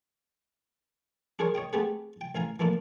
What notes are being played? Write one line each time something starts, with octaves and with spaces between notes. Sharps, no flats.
D4 G#4 A#4 C5 C#5
C#5 D#5 G5
A3 B3 C4 G4 G#4 B4
G5
A1 E4 F5 G#5 A#5
E3 F3 A3 A#3 D4